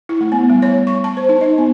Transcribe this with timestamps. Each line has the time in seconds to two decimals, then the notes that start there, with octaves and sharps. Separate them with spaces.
0.09 E4
0.21 A3
0.32 B3
0.50 G3
0.62 C#5
0.87 C#6
1.04 A5
1.17 C5
1.29 D#4
1.41 D#5
1.58 B3